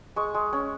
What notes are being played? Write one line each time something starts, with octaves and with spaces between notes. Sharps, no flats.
G#3 C#6
G#3
C#4